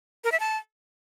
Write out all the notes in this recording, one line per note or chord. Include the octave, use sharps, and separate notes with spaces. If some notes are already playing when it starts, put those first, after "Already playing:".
A#4
E5
A5